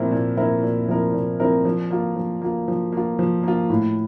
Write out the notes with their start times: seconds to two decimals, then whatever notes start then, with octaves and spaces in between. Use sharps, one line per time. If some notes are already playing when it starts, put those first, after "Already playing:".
Already playing: A#2 F3 C4 E4 A#4
0.11 A#2
0.37 F3 C4 E4 A#4
0.63 A#2
0.88 F3 C4 E4 A#4
1.13 A#2
1.40 F3 C4 E4 A#4
1.65 F3
1.91 A#3 F4
2.16 F3
2.42 A#3 F4
2.68 F3
2.93 A#3 F4
3.19 F3
3.43 A#3 F4
3.69 A2